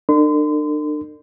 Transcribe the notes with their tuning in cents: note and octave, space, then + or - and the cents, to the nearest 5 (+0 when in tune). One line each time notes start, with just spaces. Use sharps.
D4 +40 A#4 -45 C6 -35